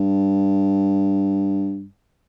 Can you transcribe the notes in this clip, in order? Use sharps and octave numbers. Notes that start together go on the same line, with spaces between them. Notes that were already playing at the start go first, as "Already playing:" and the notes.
Already playing: G2